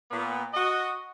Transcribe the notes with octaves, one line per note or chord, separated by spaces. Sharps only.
A#2 B3
F#4 D#5